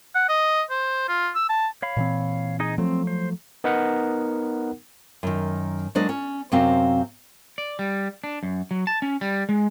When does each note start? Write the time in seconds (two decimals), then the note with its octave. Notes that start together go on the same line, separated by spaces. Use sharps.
0.15 F#5
0.29 D#5
0.70 C5
1.09 F4
1.35 E6
1.49 A5
1.82 C#5 F5 B5
1.97 A#2 E3 C4
2.60 D#4 G#4 D#5
2.78 F3 F#3 A3 C4
3.07 C5
3.64 B3 D#4 A#4 F#5
5.23 F#2 D#3
5.95 F#3 G#3 A#3 D4 D5 D#5
6.09 C#4
6.52 F#2 C3 C4 F#4 F5
7.58 D5
7.79 G3
8.24 D4
8.43 F#2
8.71 F#3
8.87 A5
9.02 C#4
9.21 G3
9.49 G#3